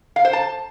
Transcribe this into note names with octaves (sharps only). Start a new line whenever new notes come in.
F5
C5
A5